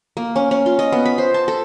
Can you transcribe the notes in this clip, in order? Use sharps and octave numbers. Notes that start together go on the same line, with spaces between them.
A#3
C#4
C#4
F4
D#5
B3
B5
C5
A5
A4